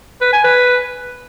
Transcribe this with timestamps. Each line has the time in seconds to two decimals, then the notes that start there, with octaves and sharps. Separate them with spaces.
0.21 B4
0.33 G#5
0.44 B4